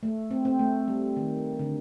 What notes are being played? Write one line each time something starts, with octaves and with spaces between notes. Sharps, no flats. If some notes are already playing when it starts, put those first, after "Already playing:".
A3
C4
C4
A3
G3
D#3
D3